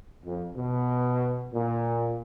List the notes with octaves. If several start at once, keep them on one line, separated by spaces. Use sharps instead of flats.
F2
B2
A#2